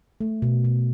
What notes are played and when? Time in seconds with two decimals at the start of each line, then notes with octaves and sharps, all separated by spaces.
0.21 A3
0.42 B2
0.64 B2